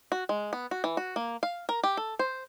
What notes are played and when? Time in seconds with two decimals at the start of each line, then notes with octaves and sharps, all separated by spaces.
0.12 F#4
0.29 G#3
0.53 B3
0.71 F#4
0.84 E3
0.97 F#4
1.16 A#3
1.43 F5
1.69 A#4
1.84 G4
1.97 A4
2.19 C5